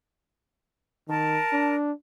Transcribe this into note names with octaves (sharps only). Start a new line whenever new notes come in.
D#3 A#4 A5
D4